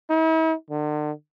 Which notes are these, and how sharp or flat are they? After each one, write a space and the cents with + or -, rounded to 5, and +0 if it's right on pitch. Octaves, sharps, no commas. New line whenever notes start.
E4 -45
D3 +40